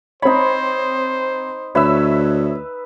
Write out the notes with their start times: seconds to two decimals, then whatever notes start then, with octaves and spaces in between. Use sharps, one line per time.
0.22 C4 D#4 C5 C#5 B5
1.75 D2 B4 C#5 E5 E6